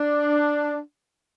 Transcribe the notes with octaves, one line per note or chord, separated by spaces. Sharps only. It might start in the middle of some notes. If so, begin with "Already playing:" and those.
Already playing: D4